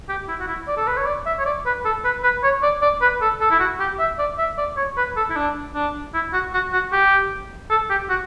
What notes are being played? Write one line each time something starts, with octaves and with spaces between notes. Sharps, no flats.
G4
E4
F#4
E4
D5
A4
B4
C#5
D5
E5
C#5
D5
B4
A4
B4
B4
C#5
D5
D5
B4
A4
A4
E4
F#4
G4
E5
D5
E5
D5
C#5
B4
A4
E4
D4
D4
E4
F#4
F#4
F#4
G4
A4
G4
F#4